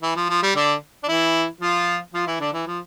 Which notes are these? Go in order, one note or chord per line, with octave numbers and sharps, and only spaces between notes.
E3
F3
F3
G3
D3 D4
D4
E3 E4
F3 F4
F3 F4
E3 E4
D3 D4
E3
F3